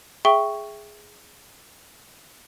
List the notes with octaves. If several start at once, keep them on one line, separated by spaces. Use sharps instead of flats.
G#4 E5 G5 C#6 G7